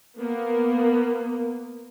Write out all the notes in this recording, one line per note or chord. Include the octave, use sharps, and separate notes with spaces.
A#3 B3